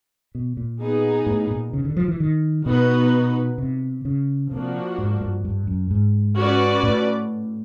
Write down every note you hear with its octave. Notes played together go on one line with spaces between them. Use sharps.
B2
A#2
B3 D#4 G#4
A2
A#2
C#3
D3
F3
E3
D#3
B2 B3 D#4 F#4 B4
C3
C#3
C3 F3 A#3 D4 F#4
G#2
G2
G2
F#2
G#2
C#4 F#4 B4 D5
A2